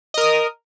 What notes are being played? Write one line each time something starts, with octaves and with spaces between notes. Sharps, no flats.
A#4 D#5 D#6